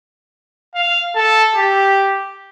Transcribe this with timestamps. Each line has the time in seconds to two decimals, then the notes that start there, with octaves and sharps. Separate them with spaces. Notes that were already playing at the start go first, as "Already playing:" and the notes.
0.75 F5
1.16 A4
1.56 G4